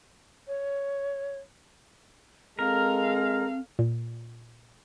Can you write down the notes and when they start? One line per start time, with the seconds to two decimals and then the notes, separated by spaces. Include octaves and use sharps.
0.47 C#5
2.59 G#3 C4 A4 A#4 F5
3.79 A#2